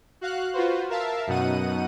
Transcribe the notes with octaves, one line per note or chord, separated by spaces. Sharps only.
F#4 F5 F#6
F4 F#4 B4 C5
A#4 E5 F5 A5
F#2 B2 D#4 F#5 D#7